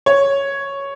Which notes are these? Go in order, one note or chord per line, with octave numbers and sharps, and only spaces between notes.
C#5